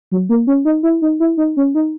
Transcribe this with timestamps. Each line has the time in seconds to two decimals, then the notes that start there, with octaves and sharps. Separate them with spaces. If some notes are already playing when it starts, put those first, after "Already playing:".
0.12 F#3
0.29 A#3
0.47 C#4
0.65 D#4
0.83 E4
1.02 D#4
1.20 E4
1.37 D#4
1.57 C#4
1.75 D#4